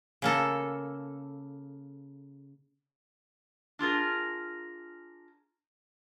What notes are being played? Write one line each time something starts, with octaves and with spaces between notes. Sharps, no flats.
C#3 A#3 A4
D4 F4 G#4 A#4